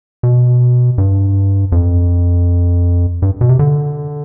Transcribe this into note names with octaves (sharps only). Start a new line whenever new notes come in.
B2
G2
F2
G2
B2
C3
D3